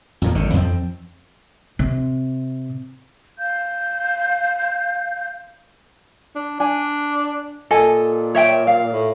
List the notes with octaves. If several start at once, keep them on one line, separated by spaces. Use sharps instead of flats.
F2 A#2 F3
G#1 D3 D#3
F2 F3 F#3 C4
C3
F5 G6
D4
D4 G#5
A#2 A4 D#5 G#5
C#5 E5 G5
F5
A2